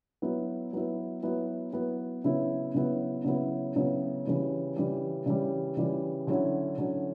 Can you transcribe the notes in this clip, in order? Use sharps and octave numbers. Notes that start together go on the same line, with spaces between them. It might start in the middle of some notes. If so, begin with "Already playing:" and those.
F#3 B3 E4
F#3 B3 E4
F#3 B3 E4
F#3 B3 E4
C#3 F#3 B3 E4
C#3 F#3 B3 E4
C#3 F#3 B3 E4
C#3 F#3 B3 E4
C#3 E3 G3
C#3 E3 G3
C#3 E3 G3
C#3 E3 G3
D3 F#3 C#4 E4
D3 F#3 C#4 E4